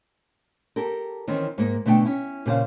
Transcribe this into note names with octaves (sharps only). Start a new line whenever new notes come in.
G4 A4 A#4
D#3 E3 C4 C#4
G#2 A#3
B2 D3 A3 C#5 G5
C#4 E4
A#2 C#3 G4 C5 F5